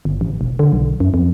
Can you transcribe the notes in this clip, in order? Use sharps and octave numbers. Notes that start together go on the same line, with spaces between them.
G1
A1
E1
D3
B1
F#2
F2